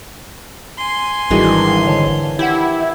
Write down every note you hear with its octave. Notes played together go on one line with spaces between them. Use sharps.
G#5 C6
G#1 D#3 E3 G3 D4 F#4 G#4
D3 C#5 A5
E4 G4 F#5 G#6